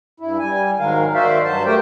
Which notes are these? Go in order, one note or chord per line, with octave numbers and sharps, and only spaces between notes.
G2 E4
G3 G#5
G#2 D#3 F#3 G#3 A#4 F5
D#3 F#4 C5 D5 E5 F5
G2 F#3 C5 A5
A3 G4 A#4 C5 G5